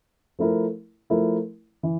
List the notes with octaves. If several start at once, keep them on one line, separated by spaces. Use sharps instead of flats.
F3 A3 E4 A#4
F3 A3 E4 A#4
E3